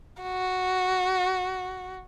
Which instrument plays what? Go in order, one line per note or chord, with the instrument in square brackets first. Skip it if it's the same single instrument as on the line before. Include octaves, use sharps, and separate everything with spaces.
[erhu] F#4